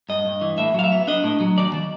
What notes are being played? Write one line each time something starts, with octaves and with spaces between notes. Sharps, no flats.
G2 D#5
G2
E3
A2 E5
F#3 F5
E5
B3
D4 D#5
A2
F#3
D#2 D5
D#3